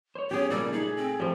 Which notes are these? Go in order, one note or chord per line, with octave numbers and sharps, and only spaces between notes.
C5 C#5
B3 C#4 G4 G#4 C#5
A#2 C#3 G3 A#3 A4 D5
A3 D#4 G#4
C4
F3 G3 A3